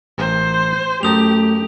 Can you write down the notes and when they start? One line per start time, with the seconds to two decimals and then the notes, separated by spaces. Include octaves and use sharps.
0.18 A1 A#4 C5
1.03 F#2 A3 G4 A5 A#5 D#6 F7